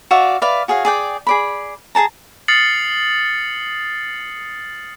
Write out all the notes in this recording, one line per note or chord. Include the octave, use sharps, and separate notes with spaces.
F#4 D5 E5 F5
B4 D5 E5 F5
F#4 G#4 C#5 F5
G#4 D5 G5
G#4 D5 B5
G#4 A4 A5 A#5
D#6 F6 A6 C7 C#7 F#7